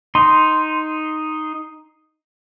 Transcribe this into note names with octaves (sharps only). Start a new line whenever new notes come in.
D#4 C6